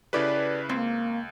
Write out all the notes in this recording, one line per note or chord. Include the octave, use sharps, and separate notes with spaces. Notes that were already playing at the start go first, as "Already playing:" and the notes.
C#3 E4 G4 A4 B4 D5
C#2 A#3 C4